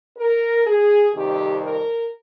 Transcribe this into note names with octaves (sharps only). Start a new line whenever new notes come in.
A#4
G#4
F2 C3 D#3 G3 G4
A#4